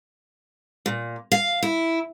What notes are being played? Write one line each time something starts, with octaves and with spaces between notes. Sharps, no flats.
A#2
F5
E4